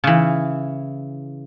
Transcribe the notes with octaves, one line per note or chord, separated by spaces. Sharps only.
C#3 E3